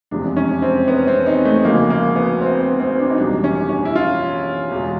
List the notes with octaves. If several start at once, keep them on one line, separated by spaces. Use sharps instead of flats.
F1 E2 C3 F3 G#3 D4
C#4
C4
B3
C4
D#4
A3
D2 C#3 F3 A#3
A#3
B3
C4
B3
C4
D4
D#4
F#1 E2 B2 G3 D4
C#4
C#4
E4
F4
E2 B2 G#3